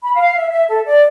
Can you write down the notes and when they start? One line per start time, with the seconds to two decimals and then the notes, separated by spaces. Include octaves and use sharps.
0.02 B5
0.14 F5
0.37 E5
0.51 E5
0.69 A4
0.86 D5